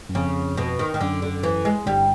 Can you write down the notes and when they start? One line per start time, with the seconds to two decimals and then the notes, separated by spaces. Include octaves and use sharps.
0.09 F#2
0.15 F2 C#3
0.57 B2
0.79 D#3
0.94 D#3
1.00 F#2 D3
1.22 D3
1.43 E3
1.65 G#3
1.86 G1 G2 G3